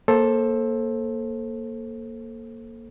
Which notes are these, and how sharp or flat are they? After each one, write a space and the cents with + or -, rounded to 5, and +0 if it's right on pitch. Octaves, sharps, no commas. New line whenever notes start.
A#3 +0 A4 +0 C5 +25